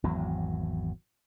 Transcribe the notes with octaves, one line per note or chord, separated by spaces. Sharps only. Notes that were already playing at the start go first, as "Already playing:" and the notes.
G#1 E2 F#3